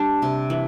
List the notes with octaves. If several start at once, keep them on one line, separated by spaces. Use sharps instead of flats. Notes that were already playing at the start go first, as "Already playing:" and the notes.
Already playing: G3 D4
C3
E3